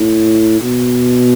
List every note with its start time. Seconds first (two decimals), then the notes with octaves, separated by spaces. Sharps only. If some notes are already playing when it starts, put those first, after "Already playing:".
Already playing: A2
0.61 B2